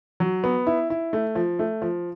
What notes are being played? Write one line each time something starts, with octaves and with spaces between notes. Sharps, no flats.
F#3
B3
E4
E4
A3
F3
A3
F3